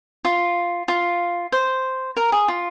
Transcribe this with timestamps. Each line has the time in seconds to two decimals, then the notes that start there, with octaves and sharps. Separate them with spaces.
0.25 F4
0.88 F4
1.52 C5
2.17 A#4
2.32 G#4
2.48 F4